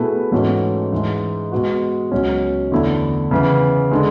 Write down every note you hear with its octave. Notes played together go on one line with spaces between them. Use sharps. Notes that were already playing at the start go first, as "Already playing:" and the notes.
Already playing: B2 A3 E4 G#4 B4
G#2 E3 A3 C#4 F#4
G#2 E3 G#3
B2 G#3 B3 F#4
C#2 B2 F#3 C#4
E2 D3 A3 E4
C#3 E3 B3
D3 G#3